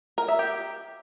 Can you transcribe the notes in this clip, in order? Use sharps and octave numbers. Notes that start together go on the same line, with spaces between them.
A#4
E5
G4